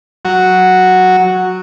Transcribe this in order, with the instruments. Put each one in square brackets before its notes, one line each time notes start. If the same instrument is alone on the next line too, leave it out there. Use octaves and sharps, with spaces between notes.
[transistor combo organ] F#3 F#4